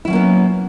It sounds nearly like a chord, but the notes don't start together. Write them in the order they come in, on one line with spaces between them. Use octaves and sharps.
E4 F#3 C#4 A#3 B3